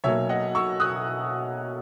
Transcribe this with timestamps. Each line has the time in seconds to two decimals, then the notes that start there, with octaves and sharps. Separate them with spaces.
0.04 B1 B2 F#3 A#3 C#5 E5
0.29 D#5 F#5
0.55 C#6 E6
0.80 D#6 F#6